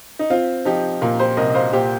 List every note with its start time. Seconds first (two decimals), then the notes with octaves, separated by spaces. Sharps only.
0.19 D#4
0.30 C4 F4
0.65 F3 D#4 G4
1.02 A#2 F4 A#4
1.19 G4 C5
1.37 C2 A#4 D#5
1.50 D#5
1.55 C5 F5
1.73 A#2 G4 C5